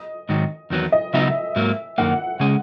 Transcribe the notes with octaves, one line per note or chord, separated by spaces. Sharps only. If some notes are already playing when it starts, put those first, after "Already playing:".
Already playing: D#5
G#2 D#3 F#3
E2 D#3 F#3 B3
D#5
C#3 F#3 B3 D#4 E5
G#2 F#3 A#3
F#2 D#3 A#3 F#5
C#3 G#3 C#4 G#4